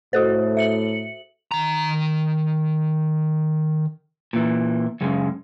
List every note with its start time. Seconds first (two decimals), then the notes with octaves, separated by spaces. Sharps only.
0.13 A2 F#4 A4 C5
0.57 E5 C#7 F#7
1.52 D#3 A#5
4.33 A#2 E3
5.01 F#2 C#3 G#3